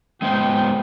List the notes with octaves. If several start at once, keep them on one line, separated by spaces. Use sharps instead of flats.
G#3 B3 C5 G5